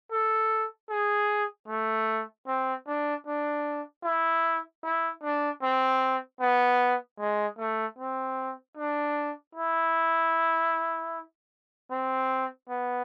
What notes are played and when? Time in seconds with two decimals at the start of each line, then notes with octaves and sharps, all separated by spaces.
0.11 A4
0.89 G#4
1.68 A3
2.46 C4
2.87 D4
3.26 D4
4.04 E4
4.83 E4
5.23 D4
5.62 C4
6.40 B3
7.19 G#3
7.58 A3
7.98 C4
8.77 D4
9.55 E4
11.91 C4
12.69 B3